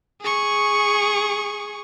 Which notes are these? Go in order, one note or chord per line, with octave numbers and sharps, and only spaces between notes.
G#4 C#6